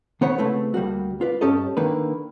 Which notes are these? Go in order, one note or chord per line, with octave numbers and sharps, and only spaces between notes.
D#3 B3 C5 C#5 F#5 B5
C#3 A3 C4 E4 B4
D2 G3 A#3 F#4
F4 B4 D5
G2 C#4 G4 A4 D#5
D3 D#3 A#3 B4